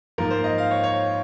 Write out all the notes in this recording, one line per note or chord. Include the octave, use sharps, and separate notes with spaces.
G#2 F3 A#3 A#4
C5
D#5
F5
C#5
C#5